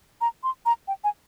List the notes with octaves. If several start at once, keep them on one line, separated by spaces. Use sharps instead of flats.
A#5
C6
A#5
G5
G#5